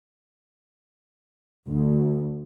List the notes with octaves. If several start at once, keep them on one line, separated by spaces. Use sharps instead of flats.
D2